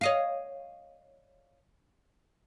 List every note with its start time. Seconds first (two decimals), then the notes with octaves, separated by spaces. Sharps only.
0.01 C#5 D#5 F5